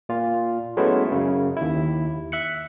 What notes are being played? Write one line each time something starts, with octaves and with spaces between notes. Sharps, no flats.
A#2 F4
F#3 G#3 A3 B3 C#4 E4
F#2 C#3
D#2 E4
E5 F#6 C#7